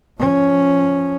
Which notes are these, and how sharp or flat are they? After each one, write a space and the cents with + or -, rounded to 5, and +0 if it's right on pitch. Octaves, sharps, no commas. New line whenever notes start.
F3 -5 C#4 +0